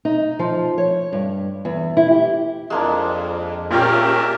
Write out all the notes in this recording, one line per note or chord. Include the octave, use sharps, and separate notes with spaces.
D#4
F3
C#5
G2
E2
E4
G4
F2 G#3 A#3 D4
A#2 C#4 F4 G4 A#4 G5
E5